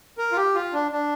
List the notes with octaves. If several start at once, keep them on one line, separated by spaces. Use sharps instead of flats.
A#4
F4
G4
F4
D4
D4